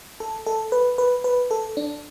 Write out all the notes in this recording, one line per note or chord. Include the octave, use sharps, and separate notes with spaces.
A4
A4
B4
B4
B4
A4
D4